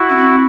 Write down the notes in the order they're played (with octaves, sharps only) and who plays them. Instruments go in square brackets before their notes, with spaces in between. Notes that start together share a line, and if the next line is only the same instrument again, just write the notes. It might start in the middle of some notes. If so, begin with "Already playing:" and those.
Already playing: [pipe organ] E4 F#4
[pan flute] C#4
C4